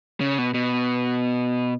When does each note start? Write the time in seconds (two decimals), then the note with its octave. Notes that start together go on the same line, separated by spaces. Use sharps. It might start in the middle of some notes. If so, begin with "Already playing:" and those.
0.21 C#3
0.38 B2
0.54 B2